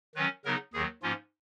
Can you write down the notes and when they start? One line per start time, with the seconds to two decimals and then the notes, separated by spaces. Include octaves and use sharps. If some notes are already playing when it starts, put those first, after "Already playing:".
0.15 D#3 F#3 C#4 B4
0.45 C#3 F#3 B3 D#4 A#4
0.74 D#2 D#3 F#3 G#4
1.02 G#2 F3 A#3 C#4 F4